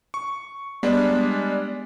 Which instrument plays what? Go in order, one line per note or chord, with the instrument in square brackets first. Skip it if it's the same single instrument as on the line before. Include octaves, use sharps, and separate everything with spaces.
[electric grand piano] C#6
[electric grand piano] G3 G#3 D4 [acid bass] B3 [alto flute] D5